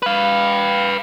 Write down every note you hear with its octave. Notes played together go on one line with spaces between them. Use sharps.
B4 F5